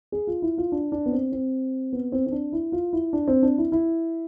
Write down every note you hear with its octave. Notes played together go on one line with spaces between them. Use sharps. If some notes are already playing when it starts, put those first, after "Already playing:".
G#4
F4
E4
F4
D4
D4
B3
C4
C4
B3
C4
C4
D4
E4
F4
E4
D4
C4
D4
E4
E4